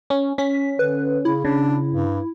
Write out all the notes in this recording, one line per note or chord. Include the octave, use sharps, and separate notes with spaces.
C#4
C#4 B6
D3 B4
C#3 E4
C#3 D4
G2